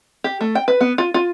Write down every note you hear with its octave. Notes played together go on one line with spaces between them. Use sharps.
G4
A3
G5
B4
B3
F4
F4